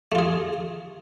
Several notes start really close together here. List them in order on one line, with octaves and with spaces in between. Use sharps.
A3 F4 G#4